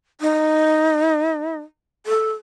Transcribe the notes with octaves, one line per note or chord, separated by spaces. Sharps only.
D#4
A4